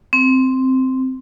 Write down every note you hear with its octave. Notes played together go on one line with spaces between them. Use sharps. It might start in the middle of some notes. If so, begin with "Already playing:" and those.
C4